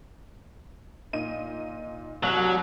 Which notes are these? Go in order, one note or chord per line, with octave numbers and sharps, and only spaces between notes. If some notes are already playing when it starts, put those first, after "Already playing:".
A#2 D#4 D#7
C2 F#3 F#6